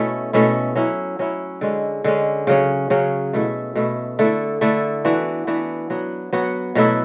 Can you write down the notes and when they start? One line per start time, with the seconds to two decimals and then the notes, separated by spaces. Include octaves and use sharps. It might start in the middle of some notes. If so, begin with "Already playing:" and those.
Already playing: B2 A3 C#4 E4
0.33 B2 A3 C#4 E4
0.76 F#3 C#4 E4
1.19 F#3 C#4 E4
1.61 D3 G#3 C#4
2.04 D3 G#3 C#4
2.47 C#3 F#3 C#4
2.90 C#3 F#3 C#4
3.33 B2 A3 E4
3.75 B2 A3 E4
4.19 D3 A3 E4
4.61 D3 A3 E4
5.05 E3 B3 D4 F#4
5.47 E3 B3 D4 F#4
5.90 F#3 B3 F#4
6.33 F#3 B3 F#4
6.75 B2 F#3 A3 E4